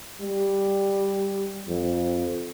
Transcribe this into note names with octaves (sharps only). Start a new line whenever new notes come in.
G3
F2